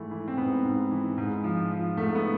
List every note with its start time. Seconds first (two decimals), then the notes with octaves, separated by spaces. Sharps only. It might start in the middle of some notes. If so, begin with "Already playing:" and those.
Already playing: G#2 E3 A3
0.11 E3
0.28 C4
0.37 G#2 B3
0.65 G#2
0.91 E3
1.18 G#2
1.44 F3
1.71 F3
1.97 G#2 A3
2.15 B3